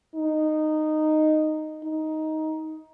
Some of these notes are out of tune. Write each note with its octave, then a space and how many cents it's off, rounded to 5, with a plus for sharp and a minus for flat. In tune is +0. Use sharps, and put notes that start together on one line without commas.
D#4 -10
D#4 +10